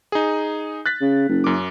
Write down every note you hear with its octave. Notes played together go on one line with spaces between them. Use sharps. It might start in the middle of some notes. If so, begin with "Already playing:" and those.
D#4 G#4
F#6 A6 B6
C#3
F#1
F#2 D6